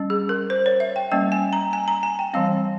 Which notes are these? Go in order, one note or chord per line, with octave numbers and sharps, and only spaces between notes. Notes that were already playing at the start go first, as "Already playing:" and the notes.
Already playing: G3 C#4
G#4
A#4
C5
C#5
E5
G5
G3 A#3 C#4 G5
G#5
A#5
G#5
A#5
G#5
G5
E3 G3 C4 F5